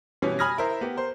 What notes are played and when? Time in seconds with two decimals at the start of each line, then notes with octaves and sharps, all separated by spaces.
0.22 B2 E3 G3 C#4
0.39 G#5 B5 D#6 F6 G#6 A#6
0.58 E4 A#4 C5 E5
0.81 B3 G4
0.96 A#4 C5